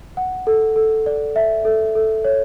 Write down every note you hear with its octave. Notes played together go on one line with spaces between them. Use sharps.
F#5
A4
A4
D5
E5
A4
A4
C#5